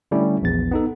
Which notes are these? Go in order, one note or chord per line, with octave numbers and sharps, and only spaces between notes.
D3 G3 A3 C#4 E4
A#1 E2 A6
B3 D#4 A4